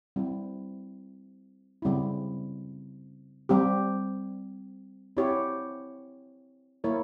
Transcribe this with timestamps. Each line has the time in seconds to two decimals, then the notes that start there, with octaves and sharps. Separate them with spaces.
0.16 G3 C4 E4
1.82 C#3 G3 C4 E4
3.49 G3 C4 G4
5.17 C4 E4 G4 C#5
6.84 A#3 E4 A#4 C#5